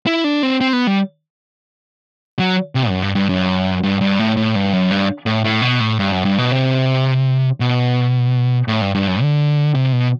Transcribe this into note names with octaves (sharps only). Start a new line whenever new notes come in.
E4
D4
C4
C4
B3
G3
F#3
C3
F#2
G2
G2
F#2
G2
G2
A2
A2
G2
F#2
G2
A2
A2
B2
A2
G2
F#2
G2
B2
C3
B2
A2
G2
G2
F#2
D3
C3
B2